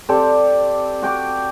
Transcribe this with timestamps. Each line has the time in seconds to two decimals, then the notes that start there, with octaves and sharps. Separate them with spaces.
0.09 C4 G4 A4 D5
1.02 F#4 G5 D6